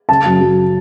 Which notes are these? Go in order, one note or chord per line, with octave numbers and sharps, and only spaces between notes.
C#3 A5
F#2
F#3